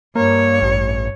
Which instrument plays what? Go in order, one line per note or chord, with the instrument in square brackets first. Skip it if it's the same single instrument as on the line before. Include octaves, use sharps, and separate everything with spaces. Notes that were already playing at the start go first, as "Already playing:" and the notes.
[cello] G2 C#5 [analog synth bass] A#3
[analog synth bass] A1